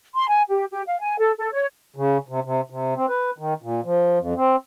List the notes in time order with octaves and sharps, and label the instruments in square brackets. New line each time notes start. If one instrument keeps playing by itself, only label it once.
[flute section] C6
G#5
G4
G4
F5
G#5
A4
A4
C#5
[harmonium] C#3
C3
C3
C3
C4
B4
D#3
A#2
F3
F2
C4